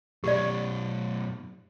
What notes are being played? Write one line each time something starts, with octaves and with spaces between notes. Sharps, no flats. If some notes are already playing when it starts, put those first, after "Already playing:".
F#2 B2 G4 D5